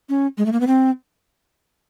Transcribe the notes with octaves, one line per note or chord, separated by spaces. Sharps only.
C#4
G#3
A3
A#3
B3
C4